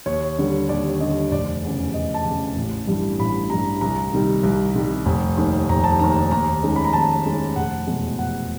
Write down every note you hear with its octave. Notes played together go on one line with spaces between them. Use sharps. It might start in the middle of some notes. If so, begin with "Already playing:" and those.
D#2 C#5
D3 G3
D#2 D5
D3 G3 D#5
F1 D5
E2 C#3
F1 D#5
A5
E2 C#3
A1
G2 E3 G3
A1 B5
G2 E3 G3 A#5
C2 A#5
C3 D#3 G3
C2
C3 D#3 G3
F1
D#2 D#3
F1 A#5
A5
D#2 D#3 A#5
D#2 A#5
D#3 G#3 C#4
B5
A#5
D#2 A5
D#3 G#3 C#4
F1 F#5
E2 B2 G#3
F1 F#5